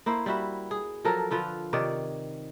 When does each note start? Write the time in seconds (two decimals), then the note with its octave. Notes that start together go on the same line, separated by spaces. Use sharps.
0.06 A#3 E4 C5
0.26 G3 E4 F#4 E5
0.71 G#4
1.05 F3 F#3 A4 A#4
1.31 D3 F3 F4 B4
1.73 C3 D#3 C#5 D5